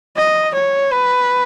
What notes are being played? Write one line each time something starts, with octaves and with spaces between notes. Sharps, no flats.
D#5
C#5
B4